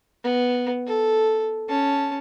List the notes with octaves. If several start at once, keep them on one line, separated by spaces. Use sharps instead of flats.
B3
A4
C#4 A5